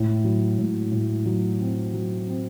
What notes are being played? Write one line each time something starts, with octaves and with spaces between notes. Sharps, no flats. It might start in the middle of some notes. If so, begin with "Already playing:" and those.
Already playing: A2
F#3
A2
A2
F#3
C4
F#3
C4